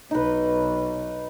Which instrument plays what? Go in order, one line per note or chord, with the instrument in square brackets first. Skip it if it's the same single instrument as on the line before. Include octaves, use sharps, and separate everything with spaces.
[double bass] B1 [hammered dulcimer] D#4 B4